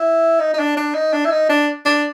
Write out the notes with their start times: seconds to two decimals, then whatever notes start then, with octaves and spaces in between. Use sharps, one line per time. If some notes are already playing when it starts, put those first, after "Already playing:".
Already playing: E4
0.40 D#4
0.54 D#4
0.59 D4
0.77 D4
0.94 D#4
1.13 D4
1.25 E4
1.31 D#4
1.49 D4
1.86 D4